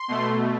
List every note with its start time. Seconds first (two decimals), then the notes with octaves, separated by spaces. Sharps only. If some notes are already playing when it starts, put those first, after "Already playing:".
Already playing: C6
0.08 B2 A3